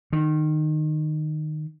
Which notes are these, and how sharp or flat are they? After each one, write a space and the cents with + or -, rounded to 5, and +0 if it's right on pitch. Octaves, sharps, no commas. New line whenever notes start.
D#3 -20